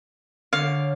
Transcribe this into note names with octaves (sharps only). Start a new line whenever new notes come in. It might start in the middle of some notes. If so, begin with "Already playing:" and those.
D3 D4 C#5 F5